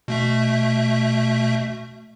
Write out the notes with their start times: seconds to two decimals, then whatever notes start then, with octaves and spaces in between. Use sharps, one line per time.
0.08 B2 A3 E5